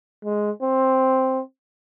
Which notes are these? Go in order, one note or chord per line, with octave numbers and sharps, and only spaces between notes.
G#3
C4